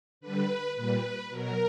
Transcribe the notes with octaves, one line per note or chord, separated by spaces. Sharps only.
D3 G3 B4
A#2 G3 B4
B2 F#3 A#4